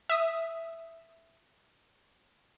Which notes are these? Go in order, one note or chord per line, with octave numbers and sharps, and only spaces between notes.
E5 D#6